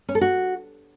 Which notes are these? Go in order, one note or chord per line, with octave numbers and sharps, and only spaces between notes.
C#4
A4
F#4